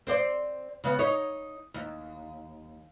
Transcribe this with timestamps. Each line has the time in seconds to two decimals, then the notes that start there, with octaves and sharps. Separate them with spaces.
0.07 C4 C5 D5
0.84 C#3 B3
0.99 D#4 C#5
1.74 D#2